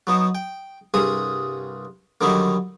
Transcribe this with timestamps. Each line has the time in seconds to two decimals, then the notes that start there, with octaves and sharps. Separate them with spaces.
0.07 F#3 B3 D#4
0.35 G5
0.94 C2 G2 G#4 D#6
2.21 D3 D#3 F#3 G3 D#4 E4